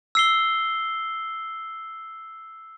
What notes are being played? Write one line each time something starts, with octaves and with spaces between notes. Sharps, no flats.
E6 C7 G7